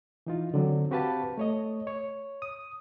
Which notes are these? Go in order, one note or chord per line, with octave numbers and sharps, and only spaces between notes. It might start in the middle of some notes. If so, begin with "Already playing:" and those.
E3 D#4 F4
D3 F#3 C4
C4 F#4 G4 B4 F5 A5
A3 C#5 D#5
C#5
D#6